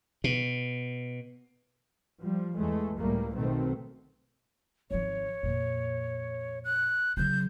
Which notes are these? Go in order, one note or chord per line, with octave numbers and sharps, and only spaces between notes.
B2
F3 G3
E2 G#3 A3
C#2 A2 G3 A3 A#3
B1 B2 D#3 A3 C4
G#1 F3 C#5
F2 A#2
F#6
C#3 F#3 G6